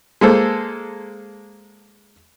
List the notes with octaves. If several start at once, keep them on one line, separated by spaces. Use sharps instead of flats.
G#3 A#3 A4 C5